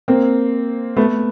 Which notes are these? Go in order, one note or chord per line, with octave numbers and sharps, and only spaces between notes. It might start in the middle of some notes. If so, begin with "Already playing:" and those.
A#3 C4
A3 B3